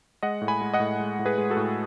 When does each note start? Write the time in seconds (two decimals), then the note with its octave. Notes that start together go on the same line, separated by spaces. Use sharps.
0.23 G#3 D#5 F#5
0.41 A2
0.48 G#5 B5
0.61 G#3
0.74 D#5 F#5
0.80 A2
1.00 G#3
1.19 A2
1.26 G#4 B4
1.38 G#3
1.50 F#4 A4
1.57 A2